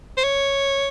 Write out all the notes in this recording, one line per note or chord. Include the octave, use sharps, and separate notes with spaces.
C5
C#5